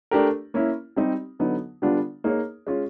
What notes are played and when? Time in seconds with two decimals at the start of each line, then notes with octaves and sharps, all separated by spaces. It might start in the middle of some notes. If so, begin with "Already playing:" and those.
0.11 A3 D4 G4 A#4
0.54 A#3 C#4 E4
0.96 G3 C4 D#4 G4
1.39 D3 F#3 B3 D#4
1.82 D3 G3 B3 D4 F4
2.24 A#3 D#4 G#4 C#5
2.67 G#3 C#4 F4